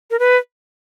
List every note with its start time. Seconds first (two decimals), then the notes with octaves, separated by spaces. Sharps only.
0.11 A#4
0.19 B4